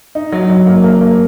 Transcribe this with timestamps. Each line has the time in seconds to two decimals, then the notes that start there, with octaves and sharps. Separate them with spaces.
0.15 D#4
0.32 F#3
0.50 F#3
0.67 A#3
0.84 A#3
1.01 A#3